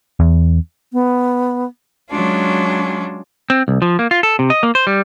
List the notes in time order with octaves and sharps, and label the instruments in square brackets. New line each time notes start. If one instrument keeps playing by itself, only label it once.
[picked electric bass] E2
[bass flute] B3
[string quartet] F#3 G#3 C#4 D4 F4
[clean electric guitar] C4
C2
F3
A#3
F4
A4
C3
D#5
A#3
C5
G3